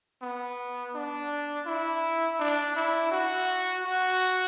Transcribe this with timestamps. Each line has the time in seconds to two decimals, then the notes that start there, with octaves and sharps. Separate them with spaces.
0.22 B3
0.95 D4
1.66 E4
2.40 D4
2.76 E4
3.12 F#4
3.85 F#4